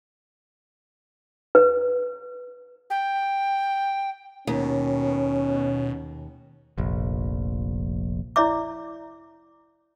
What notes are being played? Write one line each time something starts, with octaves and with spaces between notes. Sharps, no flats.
B4
G5
D#2 B2 C#4
F1 A#1
E4 C#5 D5 E5 D6